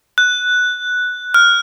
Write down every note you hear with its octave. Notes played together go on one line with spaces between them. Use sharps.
F#6
F6